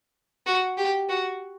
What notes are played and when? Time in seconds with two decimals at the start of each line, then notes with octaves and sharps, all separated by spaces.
0.46 F#4
0.78 G4
1.09 F#4